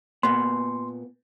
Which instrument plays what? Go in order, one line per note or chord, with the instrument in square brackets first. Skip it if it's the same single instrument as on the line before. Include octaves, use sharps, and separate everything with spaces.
[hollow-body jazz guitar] A#2 B3 [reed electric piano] C6